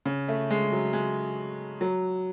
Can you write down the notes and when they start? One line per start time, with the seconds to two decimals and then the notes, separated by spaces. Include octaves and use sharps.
0.06 C#3
0.28 A3
0.51 G#3
0.72 F#3
0.93 G#3
1.81 F#3